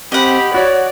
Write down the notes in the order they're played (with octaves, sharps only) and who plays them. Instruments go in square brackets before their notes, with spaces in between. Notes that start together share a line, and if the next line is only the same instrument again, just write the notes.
[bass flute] C4 [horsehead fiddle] G4 B5 [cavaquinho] D#5 F#5
[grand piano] F#4 [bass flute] C#5 [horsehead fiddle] D5